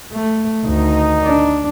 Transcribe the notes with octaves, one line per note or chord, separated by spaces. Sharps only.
A3
D2 D#3 D#4
D4